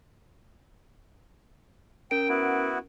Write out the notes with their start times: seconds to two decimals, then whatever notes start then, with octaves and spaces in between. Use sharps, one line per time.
2.11 C#4 A#4 G5 D7
2.29 B3 E4 F#4